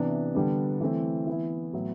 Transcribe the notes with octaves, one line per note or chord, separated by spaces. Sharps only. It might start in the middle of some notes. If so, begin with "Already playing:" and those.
Already playing: C3 E3 B3 D4
D3 G3 B3 D4
E3 A3 C4 E4
E3 B3 E4
A2 F#3 B3 E4